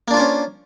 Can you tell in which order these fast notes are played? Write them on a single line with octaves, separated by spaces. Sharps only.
A#3 D4 F4 C5 C#4